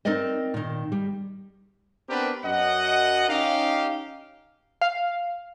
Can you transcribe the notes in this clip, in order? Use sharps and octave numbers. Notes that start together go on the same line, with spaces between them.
C4 D#4 A#4 D5 D#5
A#2 D#3
G3
B3 C4 D4 G4 A#4 B4
F#2 D#5 F#5
C#4 D#4 G4 F5
F5